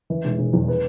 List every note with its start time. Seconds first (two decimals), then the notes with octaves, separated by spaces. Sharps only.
0.10 E3
0.25 E1
0.39 E1
0.53 E2
0.68 B3